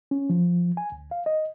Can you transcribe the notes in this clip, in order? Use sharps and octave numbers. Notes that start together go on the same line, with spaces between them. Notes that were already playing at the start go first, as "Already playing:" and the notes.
C#4
F3
G#5
D2
F5
D#5